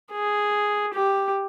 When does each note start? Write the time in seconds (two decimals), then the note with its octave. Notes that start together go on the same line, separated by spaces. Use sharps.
0.12 G#4
0.94 G4